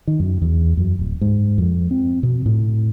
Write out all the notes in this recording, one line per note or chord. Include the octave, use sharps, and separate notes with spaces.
D#3
F#2
E2
F#2
D1
G#2
F2
C4
B2
A2